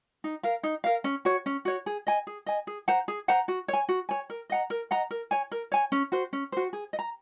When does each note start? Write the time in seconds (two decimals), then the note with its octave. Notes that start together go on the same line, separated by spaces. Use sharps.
0.24 D#4
0.43 A#4 F5
0.63 D#4
0.84 A#4 F5
1.04 C#4
1.25 F#4 C#5
1.46 C#4
1.65 F#4 C#5
1.86 G#4
2.07 D#5 G#5
2.27 G#4
2.46 D#5 G#5
2.67 G#4
2.88 C5 F#5 A#5
3.08 G#4
3.28 C5 F#5 A#5
3.48 F#4
3.68 C#5
3.73 G#5
3.89 F#4
4.09 C#5 G#5
4.30 A#4
4.50 D#5 F#5 A#5
4.70 A#4
4.91 D#5 F#5 A#5
5.11 A#4
5.31 C#5 G#5
5.52 A#4
5.72 C#5 G#5
5.92 C#4
6.12 F#4 C5
6.33 C#4
6.52 F#4 C5
6.73 G#4
6.93 D#5
6.99 A#5